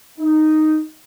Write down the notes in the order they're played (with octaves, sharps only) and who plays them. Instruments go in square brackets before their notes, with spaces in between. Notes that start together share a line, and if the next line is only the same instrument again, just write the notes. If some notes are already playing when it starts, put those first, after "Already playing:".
[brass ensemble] D#4